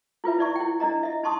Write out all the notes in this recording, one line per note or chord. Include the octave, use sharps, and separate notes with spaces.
E4 F4 B4 E5
D#4 E4 D5 E5 C#6
E4 G5
D4 E4 D#5 A#5
D#5 E5
D#4 A5 C6 C#6 D#6